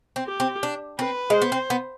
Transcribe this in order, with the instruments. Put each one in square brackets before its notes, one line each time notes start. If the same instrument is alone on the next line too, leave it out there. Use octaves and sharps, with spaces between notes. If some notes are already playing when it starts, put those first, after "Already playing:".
[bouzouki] C4
[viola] G4
[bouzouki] C4
D4
[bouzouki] C4 [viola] B4
[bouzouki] G#3 [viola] C5
[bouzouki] B3
C4
B3